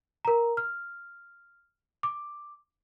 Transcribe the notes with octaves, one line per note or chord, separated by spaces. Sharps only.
A#4 A#5
F6
D6